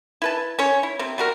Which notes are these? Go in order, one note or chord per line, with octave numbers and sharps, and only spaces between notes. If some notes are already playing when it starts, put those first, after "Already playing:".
E4 B4 A5
C#4 C#5
E4
C3 C4
G3 F#4 A#4